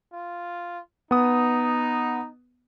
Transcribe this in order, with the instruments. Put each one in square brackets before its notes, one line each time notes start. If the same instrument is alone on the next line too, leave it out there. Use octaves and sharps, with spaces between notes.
[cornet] F4
[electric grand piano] B3 D#6 [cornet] D#4